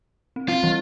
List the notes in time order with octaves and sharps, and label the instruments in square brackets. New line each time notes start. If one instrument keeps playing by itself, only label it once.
[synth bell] C4
[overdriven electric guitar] F4
[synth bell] E3 G3